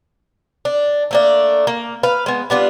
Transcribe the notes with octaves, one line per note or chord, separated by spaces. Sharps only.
D4
A3 A#3 D4
A#3
B4 F5
G#3 B3
G3 B3 D4 F4